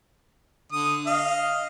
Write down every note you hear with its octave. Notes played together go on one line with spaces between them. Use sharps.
D3 D#6
D#5 F5